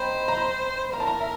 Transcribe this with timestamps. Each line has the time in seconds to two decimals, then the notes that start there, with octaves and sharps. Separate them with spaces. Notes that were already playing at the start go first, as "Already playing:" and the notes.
Already playing: C5 D#5 G5 A#5 B5
0.28 A#5
0.38 B5
0.93 A#4 A#5
1.00 A5
1.07 A#5
1.20 E5